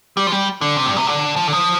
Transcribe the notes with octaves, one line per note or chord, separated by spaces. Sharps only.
G3
F3
G3
D3
C3
G2
C3
D3
F3
D3
F3